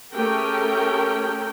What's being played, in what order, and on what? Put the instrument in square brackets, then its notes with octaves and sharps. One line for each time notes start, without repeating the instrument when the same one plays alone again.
[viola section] A3 C#4 G4 G#4 A#4 G5